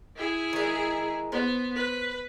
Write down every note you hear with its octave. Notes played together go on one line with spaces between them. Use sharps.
E4 G#4
D#3 G#3
B3 C5
B4